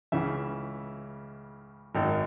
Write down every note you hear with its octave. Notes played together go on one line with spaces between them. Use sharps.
C#2 C#3 E3 E5
G#1 F#2 D#3